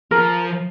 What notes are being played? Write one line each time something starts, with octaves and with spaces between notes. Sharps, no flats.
F3 A#4